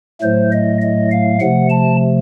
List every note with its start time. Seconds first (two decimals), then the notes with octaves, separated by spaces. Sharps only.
0.21 A2 F#3 A3 C5
0.52 D#5
0.82 D#5
1.11 F5
1.40 C3 F3 A3 F#5
1.70 A5